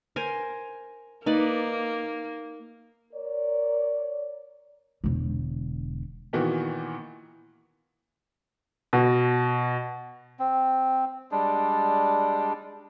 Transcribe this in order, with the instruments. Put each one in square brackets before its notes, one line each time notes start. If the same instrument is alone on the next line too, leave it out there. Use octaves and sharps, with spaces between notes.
[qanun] A#4 C5 G#5
[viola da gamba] A#3 [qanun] D#4 B4 D5
[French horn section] A#4 C#5 D5
[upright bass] E1 D3
[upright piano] A#2 D#3 E3 B3 F#4
B2
[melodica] C4
G3 G#3 D4